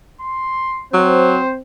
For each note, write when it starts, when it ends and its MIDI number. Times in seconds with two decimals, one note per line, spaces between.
0.21 0.84 84
0.94 1.39 54
0.94 1.61 60
0.94 1.53 72